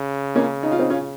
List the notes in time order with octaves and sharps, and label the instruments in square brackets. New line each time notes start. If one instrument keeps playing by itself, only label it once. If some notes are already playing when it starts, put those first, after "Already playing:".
Already playing: [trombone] C#3
[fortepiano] A#3 C#4
D#4
F4
C4 D#4
C#4 F4